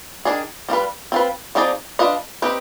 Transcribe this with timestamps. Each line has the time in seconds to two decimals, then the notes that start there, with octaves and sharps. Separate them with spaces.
0.25 D#3 G#3 D4 G#4
0.69 G3 D4 F4 B4
1.12 C4 F4 B4
1.55 F3 C4 D#4 G#4 D5
1.99 D4 F4 B4 D#5
2.42 C4 D#4 G4 B4